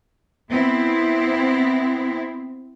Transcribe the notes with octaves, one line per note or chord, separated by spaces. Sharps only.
B3 C4 E4